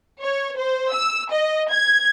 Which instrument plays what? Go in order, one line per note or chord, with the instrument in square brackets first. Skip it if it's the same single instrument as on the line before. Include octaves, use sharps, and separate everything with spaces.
[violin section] C#5
C5
E6
D#5
G#6